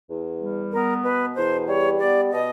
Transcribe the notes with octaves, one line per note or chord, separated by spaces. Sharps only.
E2
G3
B3 A#4
B2 B4
E2 C5
G3 C#5
B3 D5
B2 D#5